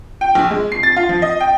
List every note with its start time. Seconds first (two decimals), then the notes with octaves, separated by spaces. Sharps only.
0.21 G5
0.35 A#1
0.51 G#3
0.72 C7
0.83 A6
0.96 F4
1.09 F3
1.22 D#5
1.41 G5